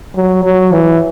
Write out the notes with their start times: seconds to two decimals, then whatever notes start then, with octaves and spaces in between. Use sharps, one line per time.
0.16 F#3
0.44 F#3
0.72 E3